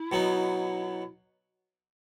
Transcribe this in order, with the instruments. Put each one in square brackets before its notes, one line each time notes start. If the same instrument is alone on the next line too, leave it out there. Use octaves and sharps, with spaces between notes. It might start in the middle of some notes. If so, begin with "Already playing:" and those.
Already playing: [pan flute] E4
[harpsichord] B2 F#3 B3 D#4